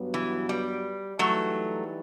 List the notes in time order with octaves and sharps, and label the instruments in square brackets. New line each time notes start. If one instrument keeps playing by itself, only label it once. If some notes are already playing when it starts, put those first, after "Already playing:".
Already playing: [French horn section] G2 F#3 B3
[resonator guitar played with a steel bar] E3
G3
[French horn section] E3 G3 D#4 [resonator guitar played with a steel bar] F#3 A3